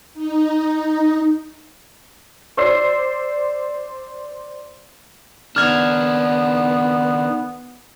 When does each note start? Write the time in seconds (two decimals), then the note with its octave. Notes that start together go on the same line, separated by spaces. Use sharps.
0.14 D#4
2.57 C5 D5 C6 E6 C7
5.56 D#3 B3 D4 F6 G#6